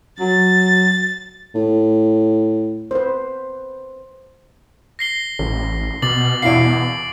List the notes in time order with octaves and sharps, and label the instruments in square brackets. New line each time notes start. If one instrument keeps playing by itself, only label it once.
[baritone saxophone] F#3 [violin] A6
[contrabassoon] A2
[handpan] B4 C5
[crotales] A#6 C7 G7
[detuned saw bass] A1
[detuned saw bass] B2 [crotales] D6 A6 F#7
[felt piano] E2 E4 F5 [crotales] C7 D7